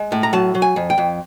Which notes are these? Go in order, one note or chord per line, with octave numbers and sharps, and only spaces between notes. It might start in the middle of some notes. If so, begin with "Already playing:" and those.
Already playing: G#3
A2
A#5
F#3 A5
F#3
G#5
F2
G5
F2